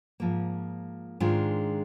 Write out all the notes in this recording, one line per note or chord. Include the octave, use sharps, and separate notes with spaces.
G#2 F3 A#3
G#2 D#3 G#3 D4 F4